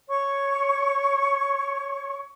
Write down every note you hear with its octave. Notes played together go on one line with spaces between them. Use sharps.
C#5 C#6